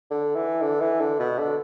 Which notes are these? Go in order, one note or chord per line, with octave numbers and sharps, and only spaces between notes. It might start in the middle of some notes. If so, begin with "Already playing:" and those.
D3
E3
D3
E3
D3
B2
D3